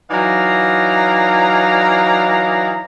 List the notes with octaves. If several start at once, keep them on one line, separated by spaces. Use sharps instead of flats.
E3 F#3 D#4 D5 F5 A#5